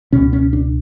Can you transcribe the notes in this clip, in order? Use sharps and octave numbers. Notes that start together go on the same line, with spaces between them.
C#2 B2 C#4
C#4
D4